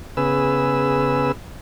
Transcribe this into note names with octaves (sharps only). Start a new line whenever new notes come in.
C#3 B3 G#4 B4 E6